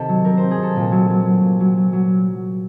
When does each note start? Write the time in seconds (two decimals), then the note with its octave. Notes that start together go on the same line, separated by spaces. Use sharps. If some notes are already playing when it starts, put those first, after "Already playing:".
Already playing: C3 D#3 A4
0.09 F#3
0.25 C3 A#4
0.37 C3 C5
0.51 G#4
0.58 C3 A4
0.76 A#2
0.92 F#3
1.10 F#3
1.25 F#3
1.43 A#2
1.60 F#3
1.77 F#3
1.93 F#3